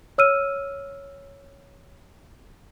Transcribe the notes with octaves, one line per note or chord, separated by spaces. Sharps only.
C#5 E6 F6 D#7